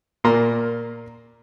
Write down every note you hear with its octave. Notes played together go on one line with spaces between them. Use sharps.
A#2 A#3 A#5 C6